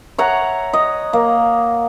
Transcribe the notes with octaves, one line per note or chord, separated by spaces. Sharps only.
C#5 E5 F#5 A#5
D#5
A#3